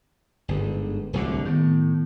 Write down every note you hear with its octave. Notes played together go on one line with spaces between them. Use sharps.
G1 G#2
D1 C2 D3
A2 D#3 B3